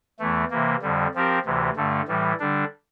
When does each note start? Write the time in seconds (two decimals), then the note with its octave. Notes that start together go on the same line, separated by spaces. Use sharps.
0.19 E2 E3 A3
0.50 C3 E3 A#3
0.82 F2 D3 G3
1.14 F3 C4 G4 A#4
1.45 D2 C3 E3
1.76 G2 D3 A3
2.08 A2 E3 G3
2.40 D3 G3 D4